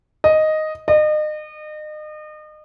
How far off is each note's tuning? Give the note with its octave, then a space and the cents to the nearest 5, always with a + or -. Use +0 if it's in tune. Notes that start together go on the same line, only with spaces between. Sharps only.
D#5 +0
D#5 -35